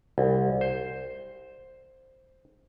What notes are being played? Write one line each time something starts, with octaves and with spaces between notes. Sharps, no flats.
C2
C5